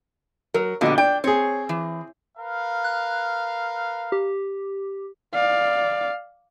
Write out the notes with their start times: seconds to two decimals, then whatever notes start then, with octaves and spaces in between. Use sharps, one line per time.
0.54 F#3 A#4
0.81 A#1 B2 D3 G4 D#5
0.98 D4 G5
1.24 C4 G#4 C#5
1.69 E3
2.38 A#4 B4 F5
2.84 F#6
4.12 G4
5.34 D5 F5